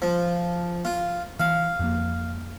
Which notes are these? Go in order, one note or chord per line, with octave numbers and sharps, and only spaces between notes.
F3
F4
E3 F5
F2 F3 A#3